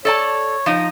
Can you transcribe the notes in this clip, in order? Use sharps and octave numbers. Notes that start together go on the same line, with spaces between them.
A4 C#5 D5 A5
F3 D#4